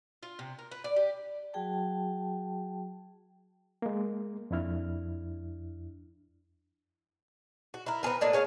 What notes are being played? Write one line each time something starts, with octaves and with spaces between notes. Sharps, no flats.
F4
C3
A#4
B4
D5
G4
F#3 F#4 G#4 G5 A5
G#3 A#3
F2 D4 E4 F6
F#4
E4 A#4
B3 C4 G#4 A#4
A2 A#3 D4 D#5
G#4 C#5 E5 F5